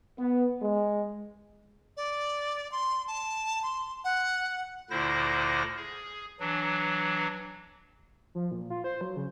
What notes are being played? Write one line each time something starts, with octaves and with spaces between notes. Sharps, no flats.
B3
G#3
D5
C6
A5
C6
F#5
D2 A#2 D3 E4 C5 A#6
G#4
E3 F#3 D4
F3
A#2
F4
C5
F#3
C#3